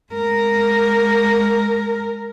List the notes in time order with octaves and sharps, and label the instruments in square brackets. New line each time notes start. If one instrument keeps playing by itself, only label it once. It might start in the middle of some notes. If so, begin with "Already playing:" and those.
[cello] G#3 A#4